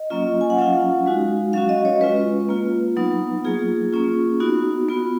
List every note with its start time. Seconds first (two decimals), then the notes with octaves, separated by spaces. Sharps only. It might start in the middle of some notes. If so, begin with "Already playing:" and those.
Already playing: D#5
0.10 F#3 A#3 C#4 F4
0.41 G#5
0.50 F#5
0.58 F#3 C#4 F4 F5
1.06 G#3 D#4 F#4
1.53 F#3 C#4 F#4 F5
1.69 D#5
1.85 C#5
2.01 G#3 C#4 F4 B4
2.49 A#3 F4
2.96 F#3 B3 D#4
3.44 F#3 A#3 F4 G#4
3.93 A#3 C#4 F4
4.40 B3 D#4 F#4
4.89 B3 F4